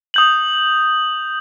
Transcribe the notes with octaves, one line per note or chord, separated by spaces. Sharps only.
D#6 G6 F#7